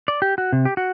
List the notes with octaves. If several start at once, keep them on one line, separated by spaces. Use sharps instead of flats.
D5
G4
F#4
C3
G4
F#4